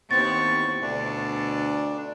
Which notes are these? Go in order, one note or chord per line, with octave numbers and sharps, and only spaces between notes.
D#2 B3 C4 E4 C#6 A6
D2 B2 D4